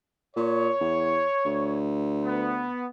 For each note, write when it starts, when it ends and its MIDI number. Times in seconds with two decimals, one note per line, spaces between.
0.36 0.70 46
0.36 1.78 73
0.81 1.24 40
1.45 2.69 38
2.25 2.86 59